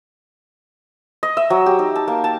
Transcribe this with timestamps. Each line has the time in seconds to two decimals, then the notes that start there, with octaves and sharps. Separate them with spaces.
1.23 D#5
1.37 E5
1.50 F#3
1.66 G4
1.79 D#4
1.96 A5
2.08 A#3
2.24 A5